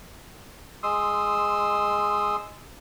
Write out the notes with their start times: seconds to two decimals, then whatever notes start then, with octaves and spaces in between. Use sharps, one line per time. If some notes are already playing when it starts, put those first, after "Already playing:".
0.83 G#3 C6 D#6 E6